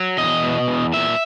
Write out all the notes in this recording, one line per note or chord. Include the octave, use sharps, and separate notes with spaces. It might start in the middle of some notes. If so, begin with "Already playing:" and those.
Already playing: F#3
E2 D#5
B2
E2
A#2 E5